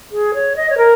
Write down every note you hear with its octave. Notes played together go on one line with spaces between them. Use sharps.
G#4
C#5
D#5
C#5
A#4